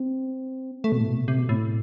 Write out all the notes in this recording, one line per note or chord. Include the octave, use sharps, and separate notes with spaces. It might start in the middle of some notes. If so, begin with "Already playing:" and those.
Already playing: C4
A3
B2
A2
B2
C3
C3
B2
A2